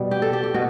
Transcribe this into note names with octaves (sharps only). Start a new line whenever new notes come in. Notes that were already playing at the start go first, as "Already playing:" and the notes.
Already playing: B2 G3
G4
A4
G4
G4
B2 F#4